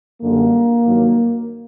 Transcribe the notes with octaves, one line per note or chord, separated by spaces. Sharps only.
F#2 D3 G3 A#3
G2 D#3 F#3